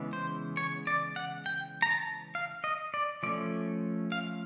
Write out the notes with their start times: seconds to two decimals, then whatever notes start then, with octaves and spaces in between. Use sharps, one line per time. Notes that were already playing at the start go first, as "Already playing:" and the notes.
Already playing: C#3 E3 G#3 B3
0.13 C5
0.57 C#5
0.87 D5
1.16 F#5
1.46 G5
1.82 A#5
1.90 A5
2.35 F5
2.64 D#5
2.94 D5
3.23 F3 A3 C#4 D5
4.12 F5